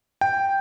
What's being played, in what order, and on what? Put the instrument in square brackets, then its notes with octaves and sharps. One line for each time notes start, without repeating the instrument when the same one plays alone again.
[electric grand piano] G5